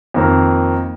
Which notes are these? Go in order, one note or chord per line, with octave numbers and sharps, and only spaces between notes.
F2 D#3 A#3